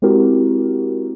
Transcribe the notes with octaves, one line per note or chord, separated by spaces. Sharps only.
G#3 C4 E4 F#4 G4 A#4